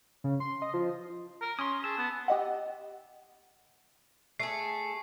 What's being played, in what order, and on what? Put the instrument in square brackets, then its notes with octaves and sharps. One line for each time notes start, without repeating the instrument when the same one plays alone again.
[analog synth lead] C#3
C6
D#5
F3
[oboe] A#4
[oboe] C#4 [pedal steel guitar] C6 D#6
[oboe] G#4 [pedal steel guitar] A5 E6
[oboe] B3
[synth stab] G4 D#5 F#5
[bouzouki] A3 G#4 [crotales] C7